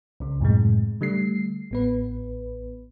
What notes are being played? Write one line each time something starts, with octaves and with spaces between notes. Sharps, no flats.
C#2 C#3
F#2 A2 C3 G#3
D3 G3 A3 C7
A1 B3 B4